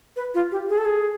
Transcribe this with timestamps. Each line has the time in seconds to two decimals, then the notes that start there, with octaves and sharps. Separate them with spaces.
0.16 B4
0.35 F4
0.52 G4
0.69 G#4
0.78 A4
0.85 G#4